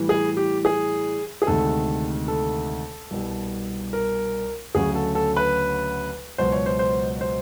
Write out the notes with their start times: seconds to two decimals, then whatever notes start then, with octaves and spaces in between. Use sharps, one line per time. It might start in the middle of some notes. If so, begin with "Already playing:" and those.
Already playing: A2 E3 G3
0.09 G#4
0.37 G4
0.65 G#4
1.42 G#4
1.47 D2 C3 D#3 G#3 A4
2.28 A4
3.11 C2 B2 G3
3.93 A#4
4.75 D2 C#3 F#3 G#4
4.95 A4
5.15 A4
5.36 B4
6.38 C#2 B2 F#3 C5
6.52 C#5
6.66 C5
6.79 C5
7.21 C5